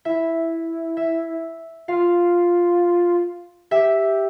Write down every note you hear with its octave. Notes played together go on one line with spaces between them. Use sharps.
E4 E5
E5
F4 F5
G4 E5